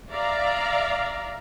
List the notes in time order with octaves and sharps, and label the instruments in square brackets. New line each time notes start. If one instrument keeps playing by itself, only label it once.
[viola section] D5 E5 F5 A#5